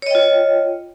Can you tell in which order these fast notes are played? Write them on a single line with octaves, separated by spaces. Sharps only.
C#5 D#5 G5 F4